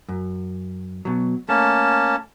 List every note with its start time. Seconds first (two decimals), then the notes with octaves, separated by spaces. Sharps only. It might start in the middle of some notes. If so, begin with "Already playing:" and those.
0.09 F#2
1.05 B2 F#3
1.49 A3 A#3 C#4 A5